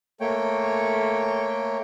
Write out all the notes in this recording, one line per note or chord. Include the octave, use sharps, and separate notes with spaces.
A3 A#3 C#5 G5